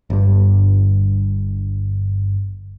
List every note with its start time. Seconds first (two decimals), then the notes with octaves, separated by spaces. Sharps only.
0.10 G1 G2